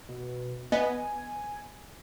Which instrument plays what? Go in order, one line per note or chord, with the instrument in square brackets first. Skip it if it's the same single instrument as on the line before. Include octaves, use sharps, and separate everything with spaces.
[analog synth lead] B2
[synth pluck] B3 [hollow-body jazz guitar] D#5 [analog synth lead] G#5